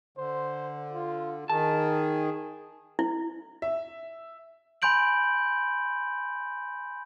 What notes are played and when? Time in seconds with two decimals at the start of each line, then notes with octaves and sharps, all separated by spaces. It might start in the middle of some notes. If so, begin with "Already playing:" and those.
0.17 D3 C5
0.93 F4
1.49 D#3 G#4 A5
2.99 E4
3.62 E5
4.82 G#5 B5 C6 G6 D7 F#7